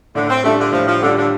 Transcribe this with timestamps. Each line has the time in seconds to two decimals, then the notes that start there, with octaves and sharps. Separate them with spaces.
0.15 A2 D3
0.29 C4
0.44 G3 A3 D4 F4
0.59 D3
0.73 A2 F3
0.87 F3
1.02 D3 G3 D4 F4
1.17 D3